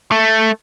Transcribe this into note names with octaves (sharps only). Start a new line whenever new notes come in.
A3